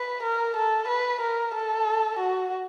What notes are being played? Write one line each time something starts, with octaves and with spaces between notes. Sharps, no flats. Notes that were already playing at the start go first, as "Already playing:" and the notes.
Already playing: B4
A#4
A4
B4
A#4
A4
F#4